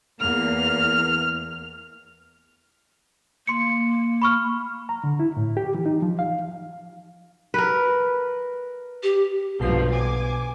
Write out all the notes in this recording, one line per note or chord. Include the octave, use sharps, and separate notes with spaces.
E2 A#3 F6
A#3 C6 C#7
B5 C#6 F6
A#5
D3
E4
A2
G4
E3
D#4
F3
F5
A#4 B4
G4
B1 G2 B2 F3 C7
G#5 D6